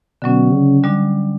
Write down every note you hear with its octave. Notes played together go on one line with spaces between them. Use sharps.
B2 D3 F#3 C#4
C#3
D3 G3 D4